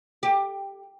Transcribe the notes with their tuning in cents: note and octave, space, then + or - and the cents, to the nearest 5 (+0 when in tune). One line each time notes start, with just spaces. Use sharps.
G4 +10